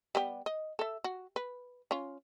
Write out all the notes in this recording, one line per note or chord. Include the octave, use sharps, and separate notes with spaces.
G3 B3 G4
D#5
A4 E5
F#4
B4
C#4 F4